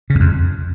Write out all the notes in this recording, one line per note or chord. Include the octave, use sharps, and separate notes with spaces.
C#3
E2
F2